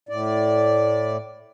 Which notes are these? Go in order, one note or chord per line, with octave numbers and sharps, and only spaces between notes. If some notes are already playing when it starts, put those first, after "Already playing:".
A2 D5